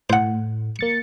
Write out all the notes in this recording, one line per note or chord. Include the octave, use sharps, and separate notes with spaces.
A2 C5 F#5
A#3 A6 C#7